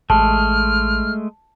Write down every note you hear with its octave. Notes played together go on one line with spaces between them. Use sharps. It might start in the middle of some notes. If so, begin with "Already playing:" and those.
A1 G#3 A3 A5 F6